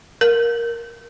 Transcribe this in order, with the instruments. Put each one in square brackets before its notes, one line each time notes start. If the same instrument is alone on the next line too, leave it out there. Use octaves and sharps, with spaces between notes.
[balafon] A#4